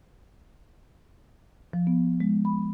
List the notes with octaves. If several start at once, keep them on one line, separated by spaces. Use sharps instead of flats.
F3
B3
G#3
B5